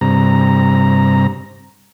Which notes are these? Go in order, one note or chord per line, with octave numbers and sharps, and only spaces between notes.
G2 C3 A#5